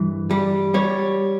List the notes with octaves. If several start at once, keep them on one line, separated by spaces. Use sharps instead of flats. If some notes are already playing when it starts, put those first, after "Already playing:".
Already playing: G2 E3
G3
G3 C#5